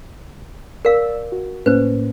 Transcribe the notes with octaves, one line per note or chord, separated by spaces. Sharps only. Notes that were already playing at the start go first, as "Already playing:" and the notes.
A#4 D5 F5 E6
F#4
A2 A#3 C#4 B4 C5